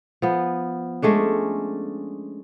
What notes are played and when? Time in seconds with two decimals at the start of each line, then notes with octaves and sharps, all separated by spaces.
0.22 F3 B3
1.02 G#3 A3 C#4 D4